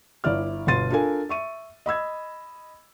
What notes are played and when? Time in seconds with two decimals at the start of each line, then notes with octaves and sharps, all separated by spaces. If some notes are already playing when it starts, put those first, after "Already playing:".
0.24 G1 E4 D5 F6
0.67 G1 B2 C6 A6 D#7
0.90 D4 F4 A4 A#4 G#5
1.29 E5 C#6 D#7
1.86 D#5 B5 E6 G#6